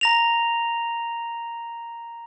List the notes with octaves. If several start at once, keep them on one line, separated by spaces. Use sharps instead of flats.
A#5 A#6 F7